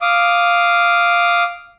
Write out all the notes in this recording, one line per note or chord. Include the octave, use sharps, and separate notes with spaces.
F5 D6 D#6